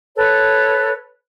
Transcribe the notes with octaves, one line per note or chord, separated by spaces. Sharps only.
A4 B4 C#5